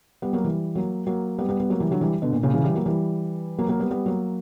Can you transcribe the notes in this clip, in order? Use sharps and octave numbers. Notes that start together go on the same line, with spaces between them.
G3 B3
F#3 A#3
E3 G3
F#3 A#3
F#3 A#3
G3 B3
G3 B3
G3 B3
F#3 A#3
E3 G3
D3 F#3
E3 G3
B2 D3
A#2
A#2 C#3
C#3 E3
E3 G3
F#3 A#3
E3 G3
F#3 A#3
F#3 A#3
G3 B3
G3 B3
F#3 A#3